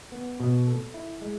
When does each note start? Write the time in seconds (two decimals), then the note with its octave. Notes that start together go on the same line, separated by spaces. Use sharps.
0.12 B3
0.40 B2
0.67 A4
0.94 E4
1.22 G#3